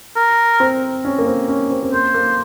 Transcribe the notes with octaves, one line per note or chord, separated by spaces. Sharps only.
A#4
C4
C#4
A#3
C4
C#4
C4
C4
A#3 C5
A#3